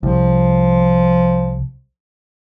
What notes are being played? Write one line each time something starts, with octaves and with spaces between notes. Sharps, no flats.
C2 F3